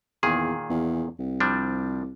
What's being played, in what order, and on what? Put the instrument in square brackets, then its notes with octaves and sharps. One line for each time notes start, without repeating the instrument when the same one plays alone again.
[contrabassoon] E2 [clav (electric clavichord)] A#2 D#3 G#4
[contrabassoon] E2
C2
[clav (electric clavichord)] F3 G3 D4